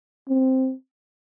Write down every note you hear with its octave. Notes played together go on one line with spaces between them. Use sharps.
C4